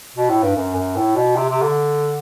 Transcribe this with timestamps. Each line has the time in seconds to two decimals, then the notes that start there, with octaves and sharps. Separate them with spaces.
0.16 B2
0.29 A2
0.43 G2
0.56 F#2
0.75 F#2
0.96 A2
1.16 B2
1.36 C3
1.49 C3
1.62 D3